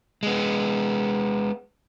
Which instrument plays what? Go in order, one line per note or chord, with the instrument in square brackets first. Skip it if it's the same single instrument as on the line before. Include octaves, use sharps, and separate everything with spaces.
[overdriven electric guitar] G#3 B3